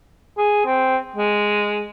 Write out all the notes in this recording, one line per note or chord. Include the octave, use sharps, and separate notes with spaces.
G#4
C4
G#3